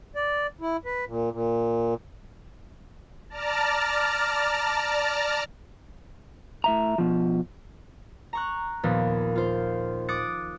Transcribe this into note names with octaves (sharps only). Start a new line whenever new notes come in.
D5
E4
B4
A#2
A#2
D5 A5 A#5 F6
A2 E5 A#5
B2 F3
A#5 C#6 F#6
D#2 A#2 F3 B3
F4 C5
D6 D#6 F#6 A6 C#7